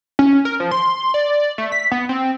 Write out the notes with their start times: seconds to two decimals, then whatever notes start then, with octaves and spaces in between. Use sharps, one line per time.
0.19 C#4
0.45 A#4
0.60 F3
0.71 C6
1.14 D5
1.58 A3
1.72 B6
1.91 B3
2.09 C4